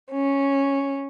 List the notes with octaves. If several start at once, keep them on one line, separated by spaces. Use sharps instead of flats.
C#4